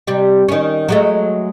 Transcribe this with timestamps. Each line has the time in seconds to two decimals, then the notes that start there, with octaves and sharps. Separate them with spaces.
0.07 C3 G3
0.49 D#3 C#4
0.89 F#3 G#3 A3